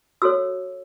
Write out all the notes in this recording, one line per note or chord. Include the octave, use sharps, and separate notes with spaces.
F#4 A4 C#5 E6